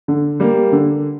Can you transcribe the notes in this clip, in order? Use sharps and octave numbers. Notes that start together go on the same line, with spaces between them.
D3
G3 A#3
D3